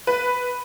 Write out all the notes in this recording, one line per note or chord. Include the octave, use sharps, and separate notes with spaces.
B4